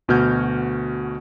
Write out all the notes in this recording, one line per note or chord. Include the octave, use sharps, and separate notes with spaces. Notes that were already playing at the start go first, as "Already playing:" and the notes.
D2 B2 F#4 F6 G6 G#6